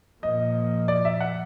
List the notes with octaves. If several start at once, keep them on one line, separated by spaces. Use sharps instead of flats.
A#2 F3 A#3 D#5
D5
E5
F#5